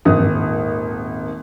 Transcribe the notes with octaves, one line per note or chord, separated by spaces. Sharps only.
D#1 G#1 D#6